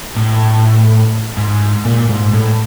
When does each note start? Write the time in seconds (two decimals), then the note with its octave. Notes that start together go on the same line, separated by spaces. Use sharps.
0.16 A2
1.37 G#2
1.85 A#2
2.09 G#2
2.34 A2